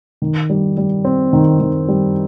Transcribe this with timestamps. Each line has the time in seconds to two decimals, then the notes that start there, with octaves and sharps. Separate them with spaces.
0.22 D#3
0.50 G3
0.77 G3
1.05 C4
1.33 D#3
1.60 D#3
1.88 G3